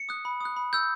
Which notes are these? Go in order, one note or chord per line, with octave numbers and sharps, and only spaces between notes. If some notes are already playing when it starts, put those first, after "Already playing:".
Already playing: C#7
D#6 F#6
B5
D#6 F#6
B5
E6 G6